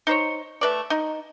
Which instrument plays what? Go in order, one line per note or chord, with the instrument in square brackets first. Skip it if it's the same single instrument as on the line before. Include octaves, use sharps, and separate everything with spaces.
[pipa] D#4 C5 C#5
A3 B4 D5
D#4